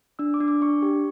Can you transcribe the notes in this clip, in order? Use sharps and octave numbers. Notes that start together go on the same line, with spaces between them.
D4 E6
D6
D4
D6
D4 C#6
G4